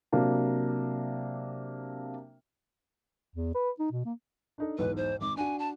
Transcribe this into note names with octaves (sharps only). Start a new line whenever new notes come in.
C3 F#3 A#3 D4
E2
B4
D#4
B2
A#3
D4 D#4 A4
B1 E2 G#2 B4
C5
G#1 D6
D4 F#4 G#5
A5